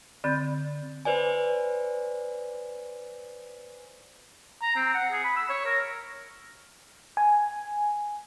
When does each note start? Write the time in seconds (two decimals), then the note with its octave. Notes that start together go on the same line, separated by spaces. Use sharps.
0.24 D3 C4 D5 B5 G6 A6
1.05 B4 C5 D5 G#5
4.62 A#5
4.76 C4
4.94 F#5
5.12 G#4
5.24 B5
5.36 E6
5.49 C#5
5.65 A#4
7.17 G#5